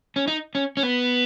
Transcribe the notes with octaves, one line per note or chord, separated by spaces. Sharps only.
C#4
D#4
C#4
C#4
B3